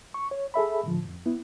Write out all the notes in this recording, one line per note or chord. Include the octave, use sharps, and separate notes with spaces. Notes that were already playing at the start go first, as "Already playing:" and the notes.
C#6
C#5
G#4 A4 E5 B5
A2 D3 F3
F2
B3 E4